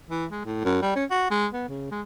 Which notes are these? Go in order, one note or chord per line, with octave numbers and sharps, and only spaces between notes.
E3
G#3
A2
F#2
G3
C#4
F#4
G#3
B3
C#3
G#3